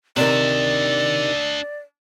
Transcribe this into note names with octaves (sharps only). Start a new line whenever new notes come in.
C3 D#3 D4 D5 E5